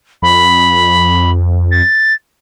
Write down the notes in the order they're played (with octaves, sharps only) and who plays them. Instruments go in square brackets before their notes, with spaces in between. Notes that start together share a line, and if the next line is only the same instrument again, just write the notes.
[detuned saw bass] F2 [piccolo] B5
[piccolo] A6